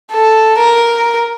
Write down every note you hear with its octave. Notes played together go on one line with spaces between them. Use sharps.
A4
A#4